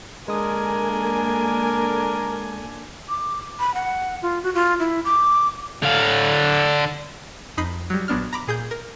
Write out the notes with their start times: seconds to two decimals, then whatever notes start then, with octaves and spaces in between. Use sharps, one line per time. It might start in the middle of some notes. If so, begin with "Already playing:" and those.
0.28 D3 G#3 A#3 D4 A#4 G#5 D#6
3.09 D6
3.60 B5
3.74 F#5
4.22 F4
4.43 F#4
4.55 F4
4.79 E4
5.05 D6
5.83 D3 F5
7.57 F2 D#4 B5 C7
7.90 F#3 G3
8.08 A#1 F#3 B3 D4 F6
8.33 A#5 B5 D6
8.48 A#2 G#4 D#6 G6
8.71 A#4